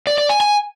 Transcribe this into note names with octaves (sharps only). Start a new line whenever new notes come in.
D5
D5
G#5
G#5